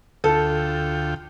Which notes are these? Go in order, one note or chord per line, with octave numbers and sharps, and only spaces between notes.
D2 F4 A4 G5